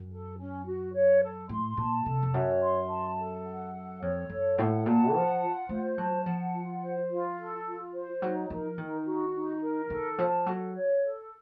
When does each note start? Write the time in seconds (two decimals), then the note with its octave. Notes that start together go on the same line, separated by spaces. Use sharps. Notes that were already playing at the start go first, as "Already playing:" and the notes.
Already playing: F#2
0.09 A4
0.38 C#4
0.66 F#4
0.93 C#5
1.22 A4
1.49 A2 C6
1.77 A#2 A5
2.05 C3 A4
2.23 F2
2.33 F#2 C#5
2.61 C6
2.90 A5
3.18 A4
3.45 F#5
3.74 A4
4.02 F2 C#5
4.29 F#2 A4
4.58 A2 F#5
4.85 A#2 A5
5.14 F3 F#5
5.42 F4
5.69 A3 C5
5.98 F#3 A5
6.26 F3 F#5
6.54 F4
6.81 C5
7.09 F4
7.38 A4
7.65 F4
7.94 C5
8.22 F#3 D#4
8.50 F3 A#4
8.78 D#3 D#4
9.06 F#4
9.34 D#4
9.61 A#4
9.90 D#3 A4
10.18 F3 A5
10.46 F#3 A4
10.75 C#5
11.03 A4